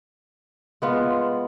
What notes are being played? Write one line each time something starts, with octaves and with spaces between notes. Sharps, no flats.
G#3 B3 F4